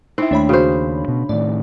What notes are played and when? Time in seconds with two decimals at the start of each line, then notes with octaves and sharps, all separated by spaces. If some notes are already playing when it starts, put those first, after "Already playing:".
0.18 C4 D#4 E4 E5
0.31 D#2 A3 D4 C#5 B5
0.49 C#3 F#4 C5
1.08 B2
1.29 A2 D#3 D5